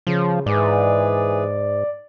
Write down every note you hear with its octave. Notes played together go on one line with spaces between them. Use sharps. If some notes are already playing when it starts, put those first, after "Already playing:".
C#3 F3
G#2 E3 G#4 B4 D5